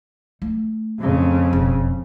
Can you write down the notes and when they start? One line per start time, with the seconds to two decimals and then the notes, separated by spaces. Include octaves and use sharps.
0.42 A3
0.99 F2 C#3
1.53 E1